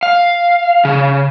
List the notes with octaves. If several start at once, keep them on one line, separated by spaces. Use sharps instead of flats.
F5
C#3